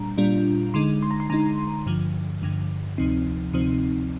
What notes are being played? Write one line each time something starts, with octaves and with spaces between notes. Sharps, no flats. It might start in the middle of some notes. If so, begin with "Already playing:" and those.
Already playing: A#2 G3 D4 A#5
A#2 G3 D4 F4
D3 G#3 D#4 C6
C6
A#5
C6
D3 G#3 D#4 A#5
G2 D3 F3
G2 D3 F3
D2 C3 F3 C4 D#4
D2 C3 F3 C4 D#4